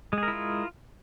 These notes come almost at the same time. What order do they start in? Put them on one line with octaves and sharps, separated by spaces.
G#3 G#4 A#4 E4 F4